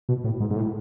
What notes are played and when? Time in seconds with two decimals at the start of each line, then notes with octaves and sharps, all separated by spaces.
0.09 B2
0.24 A2
0.40 G#2
0.51 G#2
0.56 A2